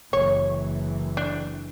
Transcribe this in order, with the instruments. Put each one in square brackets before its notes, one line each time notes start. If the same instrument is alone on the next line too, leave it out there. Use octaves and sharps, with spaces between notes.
[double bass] F#1 E3 [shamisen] C#5
[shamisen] D4